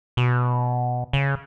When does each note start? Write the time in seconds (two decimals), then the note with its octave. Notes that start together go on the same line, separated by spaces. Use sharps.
0.17 B2
1.13 C#3